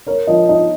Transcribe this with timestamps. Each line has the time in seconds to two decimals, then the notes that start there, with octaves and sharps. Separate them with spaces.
0.07 A#4 C#5
0.27 F3 D#5
0.49 D#4 D#5